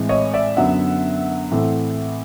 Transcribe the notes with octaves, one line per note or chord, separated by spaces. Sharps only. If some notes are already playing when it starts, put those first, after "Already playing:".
Already playing: A2 E3 G#3 C4
C#5 D#5
D5 E5
F#2 D3 F#3 B3 E5 F#5
A2 E3 A3 C4